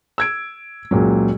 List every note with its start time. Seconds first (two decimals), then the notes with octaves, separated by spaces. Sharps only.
0.18 E6 G#6 D7
0.91 C#2 A#2 F#3